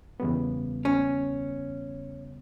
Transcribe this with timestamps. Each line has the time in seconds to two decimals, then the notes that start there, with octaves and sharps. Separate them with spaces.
0.20 E2 C#3 G3 B3
0.85 C#4